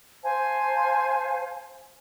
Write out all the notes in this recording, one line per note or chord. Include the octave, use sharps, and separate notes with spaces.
C5 F5 G#5 A5